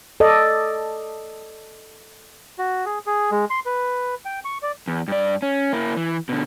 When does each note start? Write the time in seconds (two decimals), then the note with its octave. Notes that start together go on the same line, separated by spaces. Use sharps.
0.20 A4 D5 D#5
2.59 F#4
2.86 G#4
3.06 G#4
3.31 G#3
3.50 C6
3.66 B4
4.25 G5
4.45 C#6
4.63 D5
4.88 E2
5.08 G2 D5
5.42 C#4
5.73 A#3 E4
5.97 E3
6.29 B2 D3